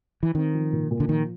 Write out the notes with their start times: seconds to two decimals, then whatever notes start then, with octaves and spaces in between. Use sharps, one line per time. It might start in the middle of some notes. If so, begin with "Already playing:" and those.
0.23 E3
0.35 D#3 C4
0.54 F3
0.73 A#2
0.91 A#2
1.00 D3
1.09 D#3 F3